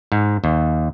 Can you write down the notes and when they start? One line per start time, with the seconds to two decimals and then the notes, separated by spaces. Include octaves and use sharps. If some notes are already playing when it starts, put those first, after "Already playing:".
0.12 G#2
0.44 D#2